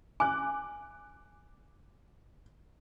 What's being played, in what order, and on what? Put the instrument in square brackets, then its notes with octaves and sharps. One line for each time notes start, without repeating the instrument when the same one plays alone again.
[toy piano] G#5 [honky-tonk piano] D6 F#6